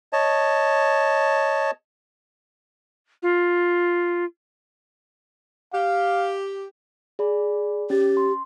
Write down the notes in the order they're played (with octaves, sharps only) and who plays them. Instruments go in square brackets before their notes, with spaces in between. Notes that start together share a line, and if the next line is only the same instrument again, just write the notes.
[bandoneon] C#5 D#5 A5
[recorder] F4
[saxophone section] G4 [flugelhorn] F5
[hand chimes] G#4 D5 B5
[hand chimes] C#4 A6 [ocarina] G4
[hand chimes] C6